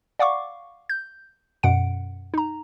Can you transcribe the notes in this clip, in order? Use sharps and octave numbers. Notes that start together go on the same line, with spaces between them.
D5 F5 F#5 C#6 D6
G6
F#2 B2 F#5 D7
D#4 A#5